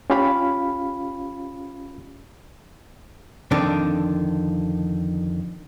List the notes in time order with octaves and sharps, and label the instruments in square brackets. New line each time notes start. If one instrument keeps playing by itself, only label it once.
[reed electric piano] C#4 F4 G4 F5 B5
[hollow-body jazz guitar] F2 D3 D#3 D4